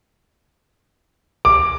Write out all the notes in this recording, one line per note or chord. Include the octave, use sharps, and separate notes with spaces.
D6